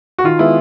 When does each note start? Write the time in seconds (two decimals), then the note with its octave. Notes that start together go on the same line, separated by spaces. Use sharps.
0.18 F#4
0.24 D#3 F4
0.39 G#3 B3 E4